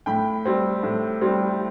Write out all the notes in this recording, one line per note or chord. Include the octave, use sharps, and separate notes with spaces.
A2 G5 B5
G3 C4
A2
G3 C4